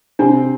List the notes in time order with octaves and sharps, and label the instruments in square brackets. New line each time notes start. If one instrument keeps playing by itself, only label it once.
[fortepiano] C3 C4 [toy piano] D4